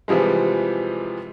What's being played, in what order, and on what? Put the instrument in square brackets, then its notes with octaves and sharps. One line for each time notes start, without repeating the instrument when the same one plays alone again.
[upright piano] C3 E3 F3 G3 G#3